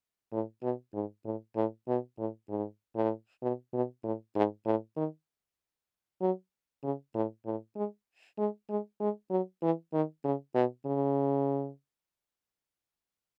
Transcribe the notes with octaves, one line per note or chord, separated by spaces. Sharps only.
A2
B2
G#2
A2
A2
B2
A2
G#2
A2
B2
B2
A2
G#2
A2
D#3
F#3
C#3
A2
A2
G#3
G#3
G#3
G#3
F#3
E3
D#3
C#3
B2
C#3